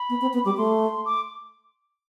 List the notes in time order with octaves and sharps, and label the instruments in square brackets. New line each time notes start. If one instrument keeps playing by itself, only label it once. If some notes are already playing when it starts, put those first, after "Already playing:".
Already playing: [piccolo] B5
[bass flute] B3
C4
B3
[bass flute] G3 [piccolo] D6
[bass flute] A3 [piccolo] C6
[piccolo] D6